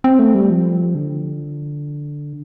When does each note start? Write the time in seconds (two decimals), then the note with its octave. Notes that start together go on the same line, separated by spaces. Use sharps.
0.04 C4
0.19 A3
0.35 G3
0.50 F3
0.95 D3